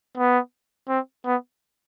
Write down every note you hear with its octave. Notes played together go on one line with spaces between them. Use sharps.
B3
C4
B3